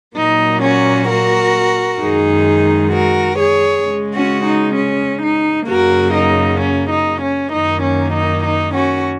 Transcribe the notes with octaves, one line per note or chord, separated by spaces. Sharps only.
A#2 F#3 A#3 D#4
C#4 F#4
F#4 A#4
F#2 D#3 G#3 D#4 G#4
F#4 A#4
G#4 C#5
C#3 G#3
C#4 F#4
D#4
C#4
D#4
F#2 C#3 F#3 A#3 F#4 A#4
D#4
C#4
D#4
C#4
F#2 D#3 A#3 D#4
C#4
D#4
D#4
C#4 F#4